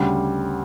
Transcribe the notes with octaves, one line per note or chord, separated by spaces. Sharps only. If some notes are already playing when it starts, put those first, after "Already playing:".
Already playing: D2 C#3 G3